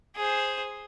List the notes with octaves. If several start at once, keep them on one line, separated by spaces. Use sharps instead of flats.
G#4 C5